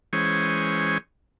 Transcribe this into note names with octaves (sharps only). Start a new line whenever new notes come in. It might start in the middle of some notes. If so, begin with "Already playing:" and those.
E3 G#3 C#4 C5 C#6